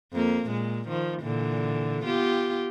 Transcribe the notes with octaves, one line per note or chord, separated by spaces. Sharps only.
F2 A#3
A#2 G#3
D#3 F3
A#2 D3 E3
B3 F4 G4